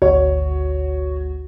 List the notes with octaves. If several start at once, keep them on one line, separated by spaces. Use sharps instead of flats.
G#1 D2 F#4 C#5